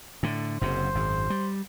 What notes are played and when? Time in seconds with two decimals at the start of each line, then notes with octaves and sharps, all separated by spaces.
0.23 A2 D3
0.61 F#1 F#2 C3 C5
0.95 G#1 F#2
1.30 G3